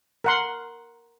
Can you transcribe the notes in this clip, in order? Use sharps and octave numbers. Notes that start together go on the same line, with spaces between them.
A#4 F#5 C6